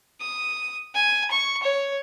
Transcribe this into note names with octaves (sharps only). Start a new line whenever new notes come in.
D#6
G#5
C#6
C#5